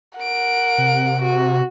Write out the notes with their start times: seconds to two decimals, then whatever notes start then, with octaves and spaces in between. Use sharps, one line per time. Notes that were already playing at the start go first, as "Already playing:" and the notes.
0.19 A#4 F#5 D7
0.78 C3
1.22 F#4